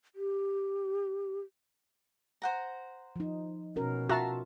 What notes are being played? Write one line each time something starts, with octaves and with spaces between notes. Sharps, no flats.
G4
C5 F#5 A#5
F3 D#4
B2 C#4 F#4 A#4
F4 F#4 E5 A5 A#5 C6